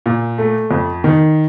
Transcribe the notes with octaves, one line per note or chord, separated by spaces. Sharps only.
A#2
A3
F2
D#3